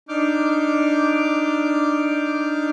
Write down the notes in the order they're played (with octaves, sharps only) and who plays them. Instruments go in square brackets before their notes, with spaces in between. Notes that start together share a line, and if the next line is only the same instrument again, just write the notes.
[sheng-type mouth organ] D4 D#4 D6 F6 G6